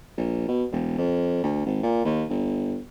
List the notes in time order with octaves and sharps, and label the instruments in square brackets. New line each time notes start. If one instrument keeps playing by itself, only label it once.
[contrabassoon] A#1
B2
E1
F2
D2
G#1
A#2
D#2
G1